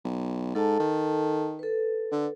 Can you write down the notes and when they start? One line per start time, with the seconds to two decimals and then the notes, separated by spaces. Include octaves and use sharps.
0.05 B1
0.55 G#2 A4 A5
0.79 D#3
1.59 A4 B4
2.12 D3